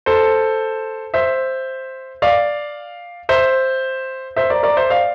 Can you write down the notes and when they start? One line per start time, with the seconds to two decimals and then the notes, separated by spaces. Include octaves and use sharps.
0.06 A4 C5
1.14 C5 E5
2.22 D5 F5
3.29 C5 E5
4.36 C5 E5
4.50 A#4 D5
4.63 A#4 D5
4.77 C5 E5
4.90 D5 F5